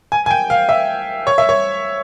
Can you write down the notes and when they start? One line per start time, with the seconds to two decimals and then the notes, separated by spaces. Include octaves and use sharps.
0.12 G#5
0.26 G#5
0.31 G5
0.50 F5
0.69 E5
1.27 C#5
1.38 E5
1.49 C#5